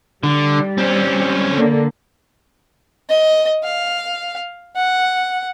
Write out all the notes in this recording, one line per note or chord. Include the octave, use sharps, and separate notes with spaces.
D3 G3
C4 C#4
D3 A#3
D#5
F5
F#5